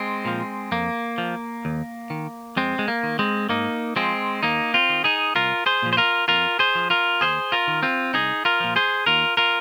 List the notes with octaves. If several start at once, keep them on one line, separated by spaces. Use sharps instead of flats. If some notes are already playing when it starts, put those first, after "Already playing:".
Already playing: G#3 C4
A#2 F3
F2 A#3
F3
D#2
D#3
F2 G#3 C4
G#3
A#3
D#3
G#3 C4
G#2 A#3 D#4
F3 G#3 C4
D#2 A#3 D#4
C4 F4
D#3
D#4 G#4
C2 F4 A#4
G#4 C5
A#2 F3
C5
F4 A#4
F2 F4 A#4
G#4 C5
F3
F4 A#4
D#2 G#4 C5
F4 A#4
D#3
C4 F4
C2 D#4 G#4
F4 A#4
A#2 F3
G#4 C5
D#2 F4 A#4
F4 A#4